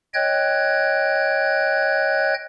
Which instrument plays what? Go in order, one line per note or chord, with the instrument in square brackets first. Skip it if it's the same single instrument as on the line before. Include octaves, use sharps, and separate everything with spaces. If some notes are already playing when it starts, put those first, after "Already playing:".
[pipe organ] C#5 D#5 G5 F#6 G#6